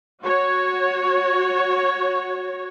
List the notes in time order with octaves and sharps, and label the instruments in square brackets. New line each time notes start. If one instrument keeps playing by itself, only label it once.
[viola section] F#4 C#5